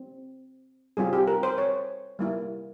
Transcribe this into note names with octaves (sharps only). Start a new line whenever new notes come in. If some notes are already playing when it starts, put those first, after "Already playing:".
Already playing: C4
G3 C4 F4 G#4
G4
A#4
C5
C#5
G3 A#3 E4